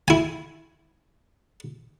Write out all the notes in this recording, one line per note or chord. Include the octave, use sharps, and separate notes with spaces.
E4 G#5